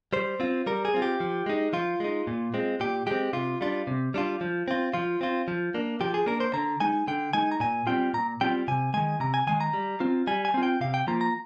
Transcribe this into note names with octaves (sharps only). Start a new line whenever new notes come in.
G3 C5
C4 F4
G3 A#4
G#4
C4 F4
G4
F3
G#3 D#4
F3 F4
G#3 D#4
A#2
G#3 C4
A#2 G4
G#3 C4 G4
C3 F4
G3 D4 F4
C3
G3 D4 F4
F3
C4 F4
F3 F4
C4 F4
F3
A#3 D4
F3 G4
G#4
A#3 D4 A#4
C5
D3 A#5
G#3 D#4 G#5
D3 G5
G#3 D#4 G#5
A#5
A#2 G#5
G3 C4 F4 G5
A#2 A#5
G3 C4 F4 G5
C3 G#5
D#3 G#3 G#5
C3 A#5
G#5
D#3 G#3 G#5
A#5
G3
C4 F4
G3 G#5
G#5
C4 F4
G5
C3 F5
G5
F3 A#3 F4 A#5
A#5